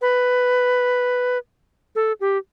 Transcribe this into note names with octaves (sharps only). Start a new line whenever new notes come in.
B4
A4
G4